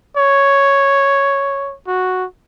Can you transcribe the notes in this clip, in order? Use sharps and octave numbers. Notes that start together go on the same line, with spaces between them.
C#5
F#4